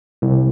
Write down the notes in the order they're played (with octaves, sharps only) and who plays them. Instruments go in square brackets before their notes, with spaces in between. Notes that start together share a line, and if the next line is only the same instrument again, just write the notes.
[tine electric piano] C2